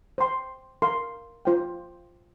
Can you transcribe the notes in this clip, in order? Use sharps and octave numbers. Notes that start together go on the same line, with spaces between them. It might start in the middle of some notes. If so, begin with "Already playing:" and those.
C5 G5 C6
A#4 F5 C6
F4 C5 G5